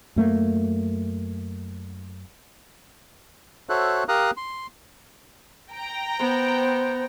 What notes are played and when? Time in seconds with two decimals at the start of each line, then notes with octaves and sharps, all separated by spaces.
0.16 F#2 A3 A#3
3.69 F#4 A4 C5 C#5 E5 F#6
4.08 G4 A#4 F5 A#5 D#6 F#6
4.37 C6
5.71 G5 A#5
6.20 B3 C5